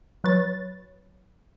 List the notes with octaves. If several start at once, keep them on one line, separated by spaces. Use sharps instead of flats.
F#3 B4 C#5 A6